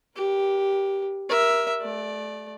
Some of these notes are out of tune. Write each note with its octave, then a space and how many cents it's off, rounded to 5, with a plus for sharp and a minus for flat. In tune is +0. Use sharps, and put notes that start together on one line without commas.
G4 +0 A#4 +45
A#4 +15 E5 +0
A3 -30 D5 +5